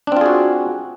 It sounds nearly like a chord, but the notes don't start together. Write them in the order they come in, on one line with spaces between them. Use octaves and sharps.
D4 C4 F4 G#4 F#4